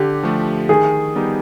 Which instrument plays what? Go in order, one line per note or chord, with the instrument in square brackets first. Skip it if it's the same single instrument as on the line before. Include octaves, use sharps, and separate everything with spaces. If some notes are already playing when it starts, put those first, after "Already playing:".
Already playing: [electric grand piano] D3 [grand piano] G4
[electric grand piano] F3 A3
[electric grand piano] D#3 [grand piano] G#4
[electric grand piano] G3 B3 D#4 G4